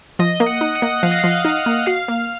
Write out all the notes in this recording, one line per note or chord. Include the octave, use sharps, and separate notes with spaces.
F3 D#5
A#3
F#5
D#4
F#5
A#3
F3 F5
D#5
F3 F5
D#4
A#3
F#4 F5
A#3